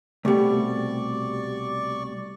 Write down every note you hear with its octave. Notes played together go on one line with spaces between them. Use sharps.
C2 B2 A3 G4 D5 C#6